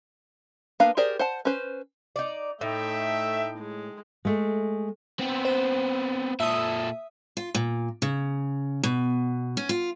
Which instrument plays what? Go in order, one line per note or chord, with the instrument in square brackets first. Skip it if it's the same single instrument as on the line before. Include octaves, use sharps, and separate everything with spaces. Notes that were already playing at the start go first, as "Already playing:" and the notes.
[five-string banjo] A#3 B3 D4 B4 F5
G4 G#4 A#4 C5 D5
C5 F#5 A5
C#4 B4 C5
[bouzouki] D#4 D5
[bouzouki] A2 [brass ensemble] A3 E5 [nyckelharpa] D#4 G5
[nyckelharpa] G#3
[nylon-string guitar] G#3 A3
[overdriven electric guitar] B3 C4
[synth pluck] C5
[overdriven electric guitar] A#2 A4 [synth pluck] E5 D#6
[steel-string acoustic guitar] F4
A#2
C#3
B2
C#4
F4